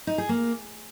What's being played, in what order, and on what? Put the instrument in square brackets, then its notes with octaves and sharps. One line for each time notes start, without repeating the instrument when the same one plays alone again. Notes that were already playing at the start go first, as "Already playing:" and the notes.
[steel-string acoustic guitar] D#4
G#4
A#3